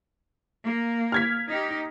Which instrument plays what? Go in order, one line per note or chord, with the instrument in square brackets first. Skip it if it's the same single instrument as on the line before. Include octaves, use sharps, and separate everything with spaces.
[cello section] A#3
[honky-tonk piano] F6 G#6 B6
[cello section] D#4 G4